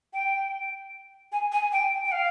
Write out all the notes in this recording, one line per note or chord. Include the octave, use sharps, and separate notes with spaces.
G5
G#5
G#5
G5
G5
F5